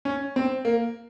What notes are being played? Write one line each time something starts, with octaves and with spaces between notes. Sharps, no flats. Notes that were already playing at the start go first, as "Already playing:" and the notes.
C#4
C4
A#3